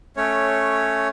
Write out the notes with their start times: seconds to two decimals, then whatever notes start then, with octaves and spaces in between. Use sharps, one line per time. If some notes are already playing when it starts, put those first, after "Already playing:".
0.17 A3 C#4 C#5